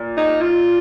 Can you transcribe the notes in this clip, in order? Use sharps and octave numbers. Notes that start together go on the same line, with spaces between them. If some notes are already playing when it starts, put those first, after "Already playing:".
Already playing: A#2
D#4
F4